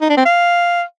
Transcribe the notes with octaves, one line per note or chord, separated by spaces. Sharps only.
D#4
D4
C4
F5